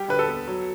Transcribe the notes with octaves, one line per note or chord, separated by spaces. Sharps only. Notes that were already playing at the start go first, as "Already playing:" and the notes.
Already playing: G3 G4
D3 B4
A4
B3
F#3